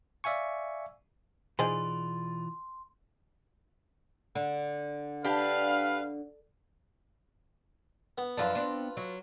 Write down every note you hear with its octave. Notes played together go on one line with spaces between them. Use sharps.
D5 E5 F5 G#5 C#6
B2 E3 D#4 F4 G#4 C5 D5 C6
D3
D4 G4 B4 F5
B3
F#2 F3 D4 F4 B4 A5
B3 C4 D4
F#3